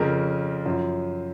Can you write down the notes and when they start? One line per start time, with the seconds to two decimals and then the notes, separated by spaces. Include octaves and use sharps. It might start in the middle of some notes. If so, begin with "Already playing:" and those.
Already playing: F2 C#3 F3 A#4
0.66 F#2 F3